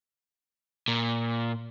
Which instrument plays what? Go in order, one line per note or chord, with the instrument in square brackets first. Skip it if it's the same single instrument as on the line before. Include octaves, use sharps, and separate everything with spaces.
[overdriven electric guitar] A#2